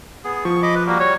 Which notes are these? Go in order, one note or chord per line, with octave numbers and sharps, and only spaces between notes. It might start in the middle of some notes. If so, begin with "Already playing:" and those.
B3 G#4
F3 C#6
D#5 B5 D6
B4
G3 A#3 F#4
C#5